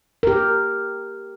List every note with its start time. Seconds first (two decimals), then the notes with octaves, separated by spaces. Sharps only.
0.23 G4 A#4